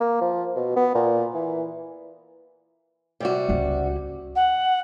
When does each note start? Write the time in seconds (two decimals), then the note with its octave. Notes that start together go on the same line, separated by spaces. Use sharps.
0.01 A#3
0.21 F3
0.56 B2
0.76 B3
0.95 A#2
1.34 E3
3.20 C3 G3 F#4
3.49 C#2 C#4
4.36 F#5